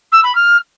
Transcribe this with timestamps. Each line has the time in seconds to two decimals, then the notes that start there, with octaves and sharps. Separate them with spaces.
0.12 E6
0.23 B5
0.35 F6